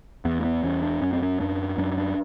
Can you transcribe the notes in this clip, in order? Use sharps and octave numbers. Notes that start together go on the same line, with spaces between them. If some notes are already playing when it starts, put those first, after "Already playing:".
E2 B3
A#3
B3
E2 C#4
D4
F#2 C#4
C4
C#4
F#2 D4
F#2 D4
D4